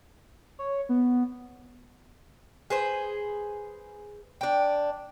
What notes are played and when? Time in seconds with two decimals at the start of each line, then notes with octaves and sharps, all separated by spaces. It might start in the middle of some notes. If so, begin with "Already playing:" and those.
0.59 C#5
0.89 B3
2.70 G#4 B4 C5
4.41 D4 G5